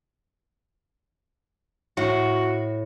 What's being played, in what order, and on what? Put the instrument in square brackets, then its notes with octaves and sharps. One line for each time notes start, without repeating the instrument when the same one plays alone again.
[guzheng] A2 [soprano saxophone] F#4